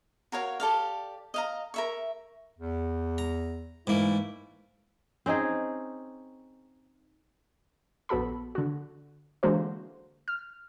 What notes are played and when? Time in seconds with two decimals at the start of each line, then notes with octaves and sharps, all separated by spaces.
0.32 F#4 A#4 C#5 F5
0.60 G4 A4 D5 F5
1.34 D#5 F5 A#5
1.74 A#4 E5 C#6
2.58 E2
3.18 A#5
3.87 G#2 E3 A3 A#3 E4
5.26 C4 C#4 D#4 G#4
8.09 A#1 B3 F#4 A4 B5
8.55 D3 F#4
9.43 D3 E3 G#3 A#3 F#4 C5
10.28 F6